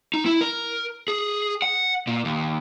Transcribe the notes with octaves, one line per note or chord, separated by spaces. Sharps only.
D#4
E4
A#4
G#4
F#5
A#2
D#2